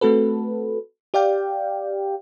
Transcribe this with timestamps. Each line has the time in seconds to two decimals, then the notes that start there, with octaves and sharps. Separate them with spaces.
0.01 A3 C4 F#4 A4 B4
1.14 G4 D5 F5 G5